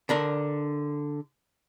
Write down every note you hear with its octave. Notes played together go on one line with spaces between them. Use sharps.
D3 D4 A#4